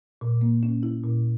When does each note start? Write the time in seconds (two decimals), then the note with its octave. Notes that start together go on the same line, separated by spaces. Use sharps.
0.21 A#2
0.41 A#3
0.63 C#4
0.83 E4
1.04 A#2